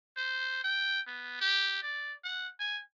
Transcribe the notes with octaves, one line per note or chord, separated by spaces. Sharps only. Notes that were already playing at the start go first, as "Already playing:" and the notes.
C5
G5
B3
G4
D5
F#5
G#5